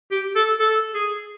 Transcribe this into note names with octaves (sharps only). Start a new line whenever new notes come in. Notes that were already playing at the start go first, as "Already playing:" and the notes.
G4
A4
A4
G#4